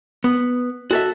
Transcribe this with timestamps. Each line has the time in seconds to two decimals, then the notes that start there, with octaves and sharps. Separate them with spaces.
0.24 B3
0.91 F#4 A4 E5